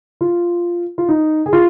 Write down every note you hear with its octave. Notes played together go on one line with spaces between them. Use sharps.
F4
F4
D#4
G#4
F4